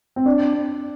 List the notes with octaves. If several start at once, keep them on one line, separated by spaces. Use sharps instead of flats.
C4
D4